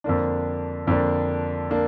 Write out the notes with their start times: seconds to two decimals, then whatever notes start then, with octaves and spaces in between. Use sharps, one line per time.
0.04 F2 D3 A#3 D4
0.87 F2 D3 A#3 D4
1.71 A#3 D4